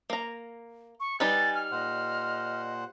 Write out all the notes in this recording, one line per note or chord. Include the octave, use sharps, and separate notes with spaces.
A#3 A#5
C#6
G3 D#4 B4 G#5 A6
F6
A#2 C5 D#5 F#5